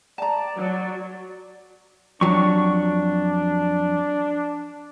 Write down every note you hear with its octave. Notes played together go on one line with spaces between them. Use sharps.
D5 A5 A#5
F#3
F2 F#3 D4 C#6